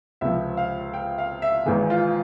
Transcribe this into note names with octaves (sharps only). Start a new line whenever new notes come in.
C#2 C3 F3 E5
F5
G5
F5
E5
G#1 G#2 E3 G#4
F4